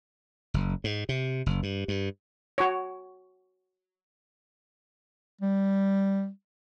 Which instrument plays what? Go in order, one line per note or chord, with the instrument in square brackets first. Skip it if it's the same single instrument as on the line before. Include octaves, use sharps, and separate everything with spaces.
[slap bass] F#1
G#2
C3
F#1
G2
G2
[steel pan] F#4 C#5
[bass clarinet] G3